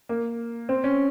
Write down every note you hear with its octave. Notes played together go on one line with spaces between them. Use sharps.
A#3
C4
C#4